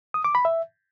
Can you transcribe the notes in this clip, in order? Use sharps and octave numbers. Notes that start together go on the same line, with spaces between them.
D#6
D6
B5
E5